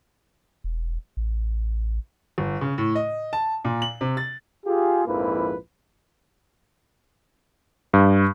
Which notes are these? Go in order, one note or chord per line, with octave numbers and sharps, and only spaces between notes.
E1
A1
G1
C#3
A2
D#5
A5
A#2
F#7
C3
A6
F4 G4 G#4
A#1 F2 G#2 A#3 E4 B4
G2